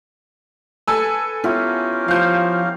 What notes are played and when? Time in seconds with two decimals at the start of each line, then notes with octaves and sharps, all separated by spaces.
0.88 A4 B4 G#5 E6
1.44 B3 C#4 E4 F4 G4 A#4
2.08 F3 F5 G6